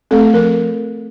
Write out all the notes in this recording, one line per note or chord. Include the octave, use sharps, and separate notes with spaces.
A3 C4 A4
F3 A#4